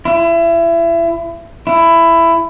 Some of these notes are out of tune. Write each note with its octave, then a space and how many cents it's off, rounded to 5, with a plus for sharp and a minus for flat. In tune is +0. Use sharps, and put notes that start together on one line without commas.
E4 +30
E4 +15